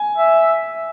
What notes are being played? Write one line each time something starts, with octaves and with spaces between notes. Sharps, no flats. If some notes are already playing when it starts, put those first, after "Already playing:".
Already playing: G#5
E5